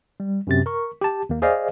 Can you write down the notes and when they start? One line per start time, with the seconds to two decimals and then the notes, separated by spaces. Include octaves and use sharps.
0.20 G3
0.47 F#2 C3 A6
0.66 A#4 C#6
1.01 G4 A5
1.29 D#2 A#3
1.42 G#4 C5 D5 D#5 F5